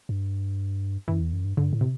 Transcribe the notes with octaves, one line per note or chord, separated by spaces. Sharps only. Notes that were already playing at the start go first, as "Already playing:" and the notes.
G2
F#2 E3
E2
F#2
G2
G2 D3
A2
C3